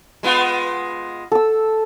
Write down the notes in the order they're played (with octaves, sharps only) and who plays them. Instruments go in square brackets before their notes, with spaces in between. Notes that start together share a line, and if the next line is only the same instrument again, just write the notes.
[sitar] G#3 B3 F4
[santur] A4 E6